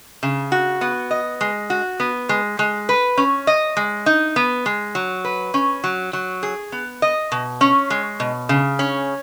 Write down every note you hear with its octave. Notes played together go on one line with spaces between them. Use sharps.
C#3
F#4
B3
D#5
G#3
F#4
B3
G#3
G#3
B4
C#4
D#5
G#3
D#4
B3
G#3
F#3
B4
C#4
F#3
F#3
G#4
B3
D#5
B2
C#4
G#3
B2
C#3
C#4